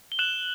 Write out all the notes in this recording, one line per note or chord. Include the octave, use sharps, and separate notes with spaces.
G7
F#6 E7 F#7